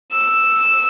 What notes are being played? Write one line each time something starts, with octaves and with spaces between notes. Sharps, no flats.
E6